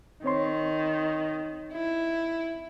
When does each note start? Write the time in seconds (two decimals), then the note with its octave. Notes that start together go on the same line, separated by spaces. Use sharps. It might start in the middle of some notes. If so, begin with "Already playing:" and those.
0.24 D#3 C4 C#5 C6
1.72 E4